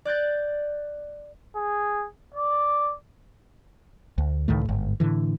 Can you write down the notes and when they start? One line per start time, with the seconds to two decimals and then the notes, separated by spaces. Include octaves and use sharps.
0.05 D5 F#6 G6 A6
1.55 G#4
2.34 D5
4.18 D2
4.48 C#2 A2 D#3 A3
4.65 G1 G#2
5.00 A2 D3 E3